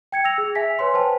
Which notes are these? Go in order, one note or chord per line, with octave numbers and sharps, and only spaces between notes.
G5 G#6 C#7
E6 A#6 F7
G#4
E5 G#5 B6
B4 C#5 G#5 C6
B4 C5 G5 A5